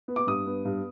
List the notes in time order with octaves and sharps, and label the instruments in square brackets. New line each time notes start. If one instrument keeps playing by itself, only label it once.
[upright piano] B3
D6
G2 D#6
B3
G2